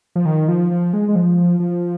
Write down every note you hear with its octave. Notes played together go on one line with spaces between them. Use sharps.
F3
D#3
F3
F3
G#3
G#3
F3
F3